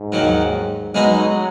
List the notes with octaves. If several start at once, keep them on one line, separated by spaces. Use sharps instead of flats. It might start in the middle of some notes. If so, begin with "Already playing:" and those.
Already playing: G#2
D#2 D#3 F#3
B1 B2 F#3 G#3 D#4 G#4